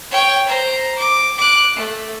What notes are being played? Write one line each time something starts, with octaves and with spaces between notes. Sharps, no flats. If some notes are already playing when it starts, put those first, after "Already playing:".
C#5 G5
C5 A#5
D6
D6 F#6
A3